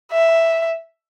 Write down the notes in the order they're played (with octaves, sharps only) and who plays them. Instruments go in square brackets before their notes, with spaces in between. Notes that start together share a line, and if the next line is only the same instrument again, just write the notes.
[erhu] E5